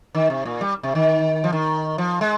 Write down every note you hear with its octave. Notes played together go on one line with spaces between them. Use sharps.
D#3
C3
A#2
G3
C3
D#3
F3
D#3
F3
G#3